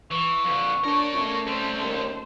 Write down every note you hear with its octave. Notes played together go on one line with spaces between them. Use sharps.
E3 C#6
F2 D3
D4 A#4 C#5 D5
A3 C#4
G3 C4 C5
D#2